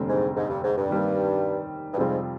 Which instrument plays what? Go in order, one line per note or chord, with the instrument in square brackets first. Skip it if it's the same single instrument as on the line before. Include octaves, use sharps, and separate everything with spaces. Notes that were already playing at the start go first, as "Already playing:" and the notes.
Already playing: [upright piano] F1 D#2 D3 G3 C4
[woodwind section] G#2
G#2
G2
G#2
G2
[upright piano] D#2 D#3 G3 C4
[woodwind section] G2
[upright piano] F2 C3 G3 C4 F4 [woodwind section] G#2